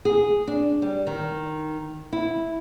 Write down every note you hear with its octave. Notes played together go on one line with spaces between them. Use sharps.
G#4
D4
G3
D#3
E4